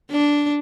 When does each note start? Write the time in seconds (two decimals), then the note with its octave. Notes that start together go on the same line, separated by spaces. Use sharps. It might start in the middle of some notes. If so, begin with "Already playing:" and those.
0.11 D4